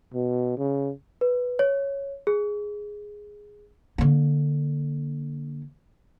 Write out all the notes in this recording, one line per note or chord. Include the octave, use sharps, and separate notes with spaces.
B2
C#3
B4
C#5
G#4
D3 A#3